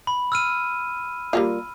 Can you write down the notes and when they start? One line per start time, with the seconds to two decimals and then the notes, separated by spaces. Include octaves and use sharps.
0.07 B5
0.32 E6 F6 D#7
1.33 G3 A#3 F4